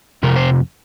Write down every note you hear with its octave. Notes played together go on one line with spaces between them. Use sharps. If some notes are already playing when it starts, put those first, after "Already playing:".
F2 C3 A#4
C5